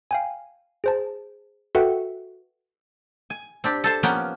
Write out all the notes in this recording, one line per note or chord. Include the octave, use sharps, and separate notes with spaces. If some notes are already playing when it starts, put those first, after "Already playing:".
F5 G5 G#5
G#4 C5 A5
F#4 A4 B4 E5 F#5 G5
G#5
C4 D4 G4
A4 C5 A5
F3 A#3 B3 C#4 G5